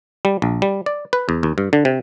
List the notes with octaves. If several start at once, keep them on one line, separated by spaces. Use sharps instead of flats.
G3
A#1
G3
D5
B4
E2
D#2
G2
D3
C3